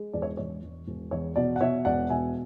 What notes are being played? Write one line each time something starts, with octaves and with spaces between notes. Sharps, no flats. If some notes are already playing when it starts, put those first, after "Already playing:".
Already playing: G#3
E1 D5
C#5
E1 C#5
E1
E1
E2 C#5
B2 D5
F#5
B2 C#5 E5
E1 D5 F#5
B2 E5 G#5